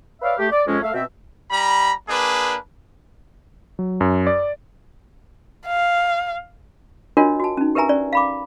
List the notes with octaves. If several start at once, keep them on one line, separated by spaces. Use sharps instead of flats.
B4 C#5 D5 E5 F5
A3 G4
D5
F2 G#3 C#4
A3 E5 F5
B2 C4 E5
G3 A#5 B5
A#3 D4 G#4 B4
F#3
F#2
D5
F5
D4 F4 F#4 A#4 C#5 D#5
F#4 A5
C#4 D#4
G4 A#4 B4 E5 G#5 A#5
C#4 D5
F5 B5 D6